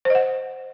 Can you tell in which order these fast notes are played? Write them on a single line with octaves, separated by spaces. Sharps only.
C5 D#5 F#5